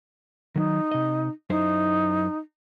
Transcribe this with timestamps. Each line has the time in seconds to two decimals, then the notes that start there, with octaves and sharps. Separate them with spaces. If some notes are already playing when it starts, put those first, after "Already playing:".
0.56 D#3 F#3 D#4
0.91 C3 D#5
1.50 F#2 D#4 E4 C5